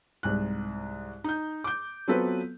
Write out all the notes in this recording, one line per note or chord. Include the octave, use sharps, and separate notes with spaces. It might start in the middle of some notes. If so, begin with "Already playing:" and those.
C2 G#2 F#6
D#4 G6
D6 G6
F#3 B3 C4 F4 A4 B4